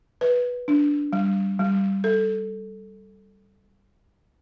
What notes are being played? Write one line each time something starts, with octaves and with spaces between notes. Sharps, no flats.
B4
D4
G3
G3
A4